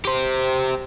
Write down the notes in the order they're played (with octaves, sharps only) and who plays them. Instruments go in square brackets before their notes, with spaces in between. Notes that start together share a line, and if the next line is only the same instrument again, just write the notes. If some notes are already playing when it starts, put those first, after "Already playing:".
[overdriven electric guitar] G4 C5